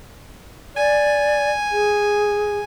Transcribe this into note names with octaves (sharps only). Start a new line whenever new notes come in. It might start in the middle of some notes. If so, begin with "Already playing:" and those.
D5 G#5
G#4